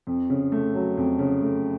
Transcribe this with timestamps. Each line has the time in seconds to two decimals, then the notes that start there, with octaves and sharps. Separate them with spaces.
0.07 F2
0.30 C#3
0.52 A3
0.75 F#3
0.97 F2
1.19 C#3
1.42 A3